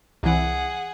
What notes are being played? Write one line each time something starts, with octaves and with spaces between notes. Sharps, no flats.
C2 E3 G#4 F#5